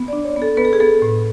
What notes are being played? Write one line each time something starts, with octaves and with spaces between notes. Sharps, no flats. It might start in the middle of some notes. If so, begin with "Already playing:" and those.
Already playing: B3
D5
D4
C#5
B3
A4
B3 B4
A4
G#4
B3 A4
A2